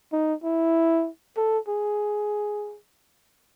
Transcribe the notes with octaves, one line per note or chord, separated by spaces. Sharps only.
D#4
E4
A4
G#4